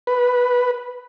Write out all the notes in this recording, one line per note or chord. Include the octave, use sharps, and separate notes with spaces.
B4